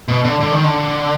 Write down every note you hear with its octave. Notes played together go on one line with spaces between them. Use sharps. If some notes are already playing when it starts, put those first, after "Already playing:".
B2
D3
D3
D#3
D3